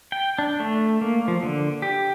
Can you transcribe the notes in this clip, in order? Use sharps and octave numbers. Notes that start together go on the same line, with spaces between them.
G5
D4
A3
A#3
F3
D3
G4